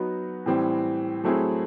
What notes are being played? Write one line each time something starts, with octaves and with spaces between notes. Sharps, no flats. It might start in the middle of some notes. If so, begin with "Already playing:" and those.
Already playing: F#3 B3 D#4 F#4
A2 E3 G3 C4
F#3 A3 C4 E4 G#4